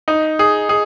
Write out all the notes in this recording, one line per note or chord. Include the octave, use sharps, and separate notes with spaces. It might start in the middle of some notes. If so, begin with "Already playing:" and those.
D#4
G#4
G#4